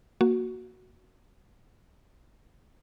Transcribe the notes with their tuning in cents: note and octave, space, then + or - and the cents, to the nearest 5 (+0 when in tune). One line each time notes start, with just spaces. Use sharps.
A#3 +5 F#4 +0